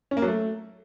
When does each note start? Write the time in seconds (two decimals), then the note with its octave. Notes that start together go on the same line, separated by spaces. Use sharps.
0.11 C#4
0.17 A#3
0.22 F#3
0.28 A3